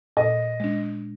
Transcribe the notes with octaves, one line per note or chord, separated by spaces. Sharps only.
A#2 D#5
G#3 D4